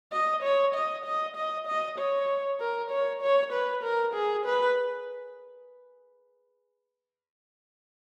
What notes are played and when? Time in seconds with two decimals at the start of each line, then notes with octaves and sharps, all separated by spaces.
0.12 D#5
0.43 C#5
0.75 D#5
1.05 D#5
1.36 D#5
1.67 D#5
1.98 C#5
2.60 A#4
2.91 C#5
3.22 C#5
3.53 B4
3.84 A#4
4.14 G#4
4.46 B4